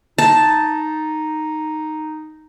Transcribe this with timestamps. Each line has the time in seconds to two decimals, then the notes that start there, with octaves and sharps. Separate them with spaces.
0.18 D#4 A5